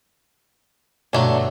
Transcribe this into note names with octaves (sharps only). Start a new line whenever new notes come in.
G1 B2 F#3 A3 D4 C6